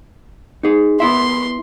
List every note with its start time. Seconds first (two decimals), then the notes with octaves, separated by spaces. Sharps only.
0.63 D#4 G#4
1.00 B3 E4 E5 C6